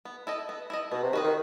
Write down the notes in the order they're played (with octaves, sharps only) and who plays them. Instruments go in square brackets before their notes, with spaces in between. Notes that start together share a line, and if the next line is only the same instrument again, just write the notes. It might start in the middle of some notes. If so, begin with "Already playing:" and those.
[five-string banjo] B3
E4 A4 D#5
B3
E4 A4 D#5
[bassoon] B2 [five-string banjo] B3
[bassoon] C3
[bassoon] D#3 [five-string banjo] F#4 B4 D#5
[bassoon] D#3